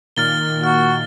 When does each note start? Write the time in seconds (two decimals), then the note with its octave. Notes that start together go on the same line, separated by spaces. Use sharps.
0.17 A#2 D#3 A#3 F6 A6 G7
0.64 F#4 F6